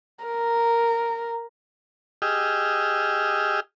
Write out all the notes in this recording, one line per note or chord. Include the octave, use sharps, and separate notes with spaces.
A#4
G4 G#4 D#5 E6 F6